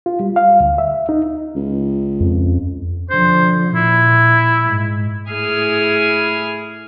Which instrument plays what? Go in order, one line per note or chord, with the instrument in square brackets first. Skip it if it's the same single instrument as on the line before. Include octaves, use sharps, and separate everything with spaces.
[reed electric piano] F4
G3
F5
D2
E5
D#4
[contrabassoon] C#2
[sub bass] F2
[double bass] D3 F3 [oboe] C5
[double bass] A#2 [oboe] E4
[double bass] G#2
[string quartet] A2 E4 G#4 G#5 D#6 F6